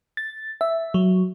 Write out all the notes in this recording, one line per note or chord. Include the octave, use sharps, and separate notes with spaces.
A6
E5
F#3